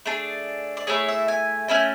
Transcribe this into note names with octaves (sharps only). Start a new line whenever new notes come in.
A3 D4 G#4 D5
D5
A3 E4 G#4 C#5
E5
G#5
A3 C#4 E4 G#5